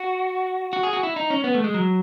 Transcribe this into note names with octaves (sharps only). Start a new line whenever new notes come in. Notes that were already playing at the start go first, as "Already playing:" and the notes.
Already playing: F#4
F#4
G#4
F#4
E4
D#4
C#4
B3
A3
G#3
F#3